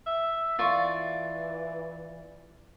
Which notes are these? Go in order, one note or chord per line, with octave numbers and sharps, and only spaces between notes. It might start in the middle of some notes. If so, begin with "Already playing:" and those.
E5
E3 F4 D5 C#6